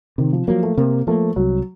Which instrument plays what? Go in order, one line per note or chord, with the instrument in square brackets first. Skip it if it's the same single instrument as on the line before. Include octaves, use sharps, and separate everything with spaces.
[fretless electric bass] C3 [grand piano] D#3
[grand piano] F3
[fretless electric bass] F3 A#3 [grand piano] F#3
[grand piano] A3
[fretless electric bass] C3 [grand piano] A#3
[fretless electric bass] F3 A#3 [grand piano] A3
[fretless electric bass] C2 [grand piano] F#3